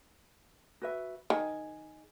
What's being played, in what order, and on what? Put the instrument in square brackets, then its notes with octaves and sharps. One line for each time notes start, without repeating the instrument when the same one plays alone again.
[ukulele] F#4 B4 E5
[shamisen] D#3 [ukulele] G#4